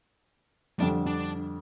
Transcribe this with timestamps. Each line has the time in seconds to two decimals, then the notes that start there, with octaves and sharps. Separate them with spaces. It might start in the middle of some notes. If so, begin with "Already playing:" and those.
0.80 F2 D3 G3 D4
1.06 D4